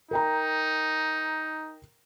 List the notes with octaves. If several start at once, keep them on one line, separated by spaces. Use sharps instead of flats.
D#4 A#4 G5 A#5